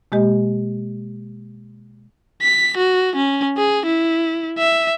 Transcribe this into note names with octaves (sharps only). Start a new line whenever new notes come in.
B2 G#3 A#3 G4 D#5
B6
F#4
C#4
G#4
E4
E5